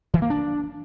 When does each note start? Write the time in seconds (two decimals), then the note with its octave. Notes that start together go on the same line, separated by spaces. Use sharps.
0.14 E3
0.22 A#3
0.30 D4